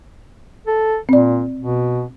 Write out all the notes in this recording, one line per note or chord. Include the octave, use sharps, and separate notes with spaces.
A4
A#2 C4 D5
B2